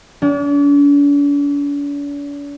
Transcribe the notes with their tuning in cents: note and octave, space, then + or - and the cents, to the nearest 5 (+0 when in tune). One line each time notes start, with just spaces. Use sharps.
D4 -45 G4 +0